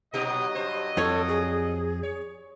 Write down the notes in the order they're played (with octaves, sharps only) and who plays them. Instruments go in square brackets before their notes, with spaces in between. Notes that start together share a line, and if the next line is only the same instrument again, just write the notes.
[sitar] A#2 D#4 G4 [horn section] F#3 D#5
[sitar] G2 C5
[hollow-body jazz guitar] F2 C#5 [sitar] G3 [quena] A4
[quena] G#4
[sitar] C#5